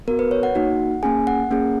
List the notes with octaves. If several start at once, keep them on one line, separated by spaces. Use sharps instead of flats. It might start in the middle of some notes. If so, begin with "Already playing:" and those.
B3 F#4 A#4
B4
C#5
F#5
A#3 D#4 F#4
A#3 C#4 G#4 G#5
F#5
A#3 C#4 G#4